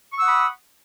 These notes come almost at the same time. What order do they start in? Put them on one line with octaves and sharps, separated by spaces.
C#6 E6 F#5 D#6 B5